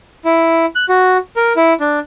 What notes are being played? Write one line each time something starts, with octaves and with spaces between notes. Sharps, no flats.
E4
F#6
F#4
A#4
E4
D4